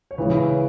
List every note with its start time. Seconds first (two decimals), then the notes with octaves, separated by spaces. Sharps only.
0.11 C#5
0.18 C#3 E3 G#3 B4